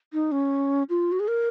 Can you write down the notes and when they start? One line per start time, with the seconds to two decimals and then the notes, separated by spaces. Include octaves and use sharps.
0.13 D#4
0.32 C#4
0.89 F4
1.12 F#4
1.20 G#4
1.28 A#4